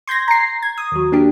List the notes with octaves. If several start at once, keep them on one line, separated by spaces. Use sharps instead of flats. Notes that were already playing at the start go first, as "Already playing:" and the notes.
C6 G6 G#6 A#6
A#5 C7
G#6
D#6
D#2 F#3
A#3 D4 G4